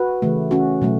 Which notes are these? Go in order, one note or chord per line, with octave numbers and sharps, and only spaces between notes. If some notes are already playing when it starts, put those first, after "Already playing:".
Already playing: F#4 B4
C#3 E3 A3
C#4 F#4
B2 F#3 A3